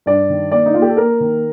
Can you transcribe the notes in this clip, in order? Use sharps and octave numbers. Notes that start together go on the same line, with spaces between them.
G2 D5
D#3
A#3 D5
D#4
A#3 F4
G4
A4
A#3 A#4
D#3